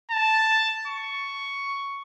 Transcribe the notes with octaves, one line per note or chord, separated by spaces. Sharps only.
A5
C#6